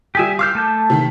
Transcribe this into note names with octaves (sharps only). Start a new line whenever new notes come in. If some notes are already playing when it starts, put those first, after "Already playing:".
G3 G4 G#4 E5 G#5 B6
F5 D6 E6 F6 G6 C7
A3 A5 G6
C3 D#3 B6